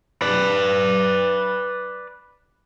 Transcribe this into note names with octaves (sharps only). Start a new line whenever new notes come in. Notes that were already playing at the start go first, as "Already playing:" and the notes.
B4 D5